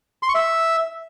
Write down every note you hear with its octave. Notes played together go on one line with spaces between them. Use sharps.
C6
C#6
E5